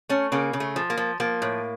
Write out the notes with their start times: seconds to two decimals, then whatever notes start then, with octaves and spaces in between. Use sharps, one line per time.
0.09 A3 C#4
0.32 C#3 A#3
0.53 C#3
0.60 A3
0.76 F3
0.90 A#3
0.97 F3
1.20 F3 A#3
1.42 A2